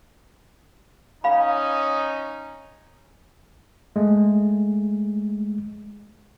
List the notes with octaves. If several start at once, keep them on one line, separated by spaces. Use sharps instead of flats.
C#4 D#4 F5 B5
G#3 A3